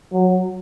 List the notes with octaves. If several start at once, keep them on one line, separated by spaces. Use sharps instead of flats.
F#3